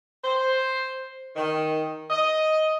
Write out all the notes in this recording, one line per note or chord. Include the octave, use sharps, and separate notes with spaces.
C5
D#3
D#5